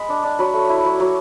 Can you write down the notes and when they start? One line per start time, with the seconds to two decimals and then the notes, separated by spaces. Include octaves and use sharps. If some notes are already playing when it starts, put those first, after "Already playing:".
Already playing: G#3 B5
0.09 D4
0.23 D4
0.39 F#3 B5
0.54 A3
0.69 E4
0.85 F#3
1.00 F#3